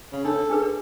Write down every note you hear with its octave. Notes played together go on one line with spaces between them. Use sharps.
C#3
D4 A4 C#5
D4 G#4 B4